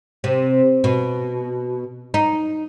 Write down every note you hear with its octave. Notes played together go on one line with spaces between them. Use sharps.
C3
B2
D#4